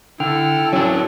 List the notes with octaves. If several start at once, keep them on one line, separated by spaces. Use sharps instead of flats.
D3 E4 A4 G5 F6
F#3 C#4 D4